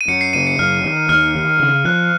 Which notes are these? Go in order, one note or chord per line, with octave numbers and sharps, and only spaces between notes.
D#7
F#2 C#7
C7
C#3 D#7
C#7
F#2 F6
D#3
D#2 F6
D#3
C#3
F3 F#6